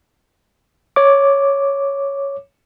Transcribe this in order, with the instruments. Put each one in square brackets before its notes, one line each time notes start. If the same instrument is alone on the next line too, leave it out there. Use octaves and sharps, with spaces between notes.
[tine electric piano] C#5 D6